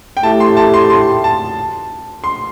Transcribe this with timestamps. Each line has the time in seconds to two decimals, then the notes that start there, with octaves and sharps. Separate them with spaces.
0.17 G5
0.23 A2 A3 E4 G4 A5
0.40 C6
0.57 A5
0.74 C6
0.90 C6
1.24 A5
2.24 C6